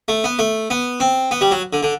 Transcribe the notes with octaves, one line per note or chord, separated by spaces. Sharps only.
A3
B3
A3
B3
C4
B3
G3
F#3
D3
D3